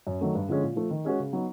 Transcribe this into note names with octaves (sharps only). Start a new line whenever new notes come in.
F#2
D#3 F#3 A3
G2
D3 F3 G#3 C#4
A#2
F3 A3
D#3
G#3 C#4 F#4
C#3
F#3 B3 D#4